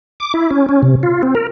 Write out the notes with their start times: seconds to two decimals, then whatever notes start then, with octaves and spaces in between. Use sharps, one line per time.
0.20 D6
0.34 E4
0.51 C#4
0.69 C#4
0.83 C3
1.03 F4
1.23 C4
1.35 A#4